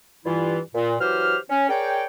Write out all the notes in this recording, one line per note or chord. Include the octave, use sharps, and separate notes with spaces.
G2 E3 E4 F4
A#2
E3 F#3 G4 C5 F6
C#4
G#4 A#4 C#5 D5 G5